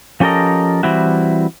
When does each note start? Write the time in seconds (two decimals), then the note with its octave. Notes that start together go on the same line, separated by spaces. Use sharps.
0.20 F3 C#4 G4 A4 A#4 D#5
0.83 E3 G3 C4 E4 F#4